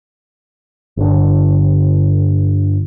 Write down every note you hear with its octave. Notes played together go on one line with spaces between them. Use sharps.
G1 D3